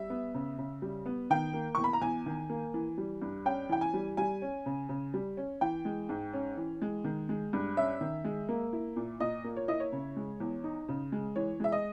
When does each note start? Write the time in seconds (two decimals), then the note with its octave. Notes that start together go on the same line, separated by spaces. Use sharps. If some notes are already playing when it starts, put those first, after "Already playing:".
Already playing: G3 E5
0.10 B3
0.34 C#3
0.58 C#3
0.82 G3
1.06 B3
1.30 D#3 G5
1.54 A#3
1.75 E2 C#6
1.84 B5
1.93 A#5
2.01 E2 G#5
2.26 D#3
2.50 A#3
2.74 E3
2.98 G3
3.22 G2
3.45 C#4 G5
3.69 E3 G5
3.81 G#5
3.94 G3
4.17 G3 G#5
4.42 C#4
4.66 C#3
4.89 C#3
5.14 G3
5.37 C#4
5.61 E3 G5
5.85 G#3
6.09 G#2
6.33 C#4
6.57 E3
6.82 G#3
7.04 D#3
7.29 G#3
7.53 G2
7.77 C#4 E5
8.01 D#3
8.24 G#3
8.49 A#3
8.73 E4
8.96 A#2
9.20 A#2 D#5
9.44 A#3
9.56 C#5
9.68 E4 D#5
9.80 C#5
9.92 C#3
10.16 G#3
10.40 E2
10.64 D#4
10.89 C#3
11.12 G#3
11.36 E3 C#5
11.60 G#3 E5
11.72 D#5